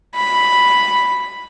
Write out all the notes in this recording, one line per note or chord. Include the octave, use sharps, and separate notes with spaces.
B5